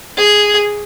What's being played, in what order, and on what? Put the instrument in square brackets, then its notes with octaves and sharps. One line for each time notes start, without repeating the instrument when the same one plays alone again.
[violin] G#4